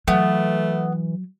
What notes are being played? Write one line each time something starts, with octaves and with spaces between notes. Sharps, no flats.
E3 F#3 A3 B3